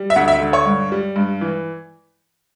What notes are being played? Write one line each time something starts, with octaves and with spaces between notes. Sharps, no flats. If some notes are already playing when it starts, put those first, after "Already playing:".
Already playing: G3
E5
D2 F#5
E5
D3
C#5
G2
G3
G2
E3